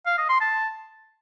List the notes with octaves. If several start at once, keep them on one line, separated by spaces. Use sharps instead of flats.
F5
D#5
C6
A5